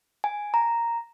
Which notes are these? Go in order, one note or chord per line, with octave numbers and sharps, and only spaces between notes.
G#5
A#5